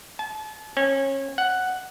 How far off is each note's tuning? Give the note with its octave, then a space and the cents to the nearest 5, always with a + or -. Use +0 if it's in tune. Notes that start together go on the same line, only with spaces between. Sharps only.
A5 -35
C#4 -30
F#5 +0